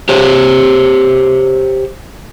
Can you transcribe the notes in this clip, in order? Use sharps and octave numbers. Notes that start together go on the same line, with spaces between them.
G4 C5 C#5